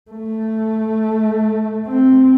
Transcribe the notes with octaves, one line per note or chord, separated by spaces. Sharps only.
A3
C4